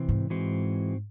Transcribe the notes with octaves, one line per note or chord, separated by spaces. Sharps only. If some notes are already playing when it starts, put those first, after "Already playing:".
Already playing: C3 E3 C4
G#2
E3 G#3 C4 F#4